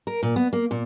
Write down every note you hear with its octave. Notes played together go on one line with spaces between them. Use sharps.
A#4
A#2
B3
A#3
A#2